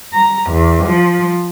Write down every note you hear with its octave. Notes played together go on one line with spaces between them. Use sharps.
A#5
E2
F3